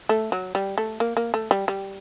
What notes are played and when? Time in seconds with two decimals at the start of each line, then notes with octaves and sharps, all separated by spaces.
0.09 A3
0.32 F#3
0.55 G3
0.78 A3
1.00 A#3
1.17 A#3
1.34 A3
1.51 G3
1.68 G3